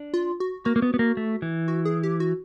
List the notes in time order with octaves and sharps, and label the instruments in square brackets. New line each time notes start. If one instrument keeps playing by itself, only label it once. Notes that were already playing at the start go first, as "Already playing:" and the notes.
Already playing: [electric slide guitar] D4
[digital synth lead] F4
F#4
[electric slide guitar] A#3 [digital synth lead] F#4
[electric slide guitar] A#3
B3
B3
A#3
A3
E3
[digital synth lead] F#4
G#4
G4
F#4